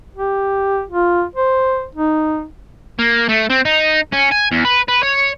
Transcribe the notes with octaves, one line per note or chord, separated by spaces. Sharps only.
G4
F4
C5
D#4
A#3
A3
C4
D#4
C#4
G#5
E2
B4
B4
C#5